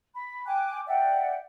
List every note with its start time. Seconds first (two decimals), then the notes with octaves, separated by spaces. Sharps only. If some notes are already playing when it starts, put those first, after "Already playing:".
0.14 B5
0.46 G5 G#5 D6 F#6
0.87 D5 E5 F#5 G5